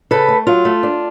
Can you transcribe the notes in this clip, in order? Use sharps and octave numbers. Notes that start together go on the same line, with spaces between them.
C#3 A4 B4
A3
F#3 F4
A3
D4